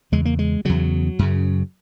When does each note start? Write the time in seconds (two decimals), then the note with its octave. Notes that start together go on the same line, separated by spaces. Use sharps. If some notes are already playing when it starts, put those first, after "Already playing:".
0.12 E2 C#3 G#3
0.25 A#3
0.39 G#3
0.65 E2 C#3 F#3
1.19 F#2 C#3